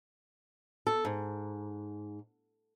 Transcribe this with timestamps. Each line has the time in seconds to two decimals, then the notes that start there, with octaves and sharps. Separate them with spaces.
0.87 A4
1.05 G#2